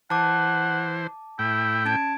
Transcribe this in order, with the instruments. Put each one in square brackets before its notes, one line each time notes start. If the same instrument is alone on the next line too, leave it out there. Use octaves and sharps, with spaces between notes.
[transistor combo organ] E3 C5 [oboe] F#5 [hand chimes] A5 D6
[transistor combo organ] A2 G5 [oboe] E4
[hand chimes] C#4 G#6 D7 [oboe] A5